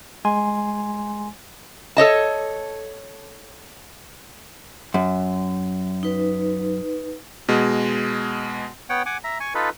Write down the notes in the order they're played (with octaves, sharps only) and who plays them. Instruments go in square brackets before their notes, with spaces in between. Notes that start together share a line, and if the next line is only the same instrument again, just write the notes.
[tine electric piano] G#3 G#5 C6
[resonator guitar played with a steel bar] A4 C#5 D#5 A5
[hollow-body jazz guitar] F#2
[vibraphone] D#4 B4
[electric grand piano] B2 G#3
[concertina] B3 C#5 F#5 G5
F#5 G#5 D6
E5 A#5
G#5 C#6
D#4 F4 A4 B4